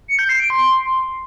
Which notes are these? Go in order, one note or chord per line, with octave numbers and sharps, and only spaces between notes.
C#7
G6
C7
D7
C6